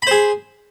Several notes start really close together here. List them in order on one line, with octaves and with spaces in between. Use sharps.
B5 C5 G#4